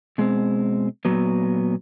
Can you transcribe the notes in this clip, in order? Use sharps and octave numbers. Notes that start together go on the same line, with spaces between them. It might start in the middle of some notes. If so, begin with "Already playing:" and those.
B2 G#3 C4
A#2 F#3 B3